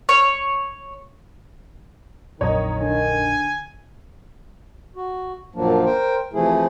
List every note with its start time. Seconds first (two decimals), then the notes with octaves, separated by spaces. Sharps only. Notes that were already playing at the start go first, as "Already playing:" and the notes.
0.09 C#5
2.41 A#1 F2 D#3 F#3 C#5 D#5 A#5
2.81 D3 G#5
4.96 F#4
5.55 F#2 A#2 F3 F#3 A#3 D4
5.85 A#4 C5 G5
6.33 C3 E3 F3 A3 E4 G#4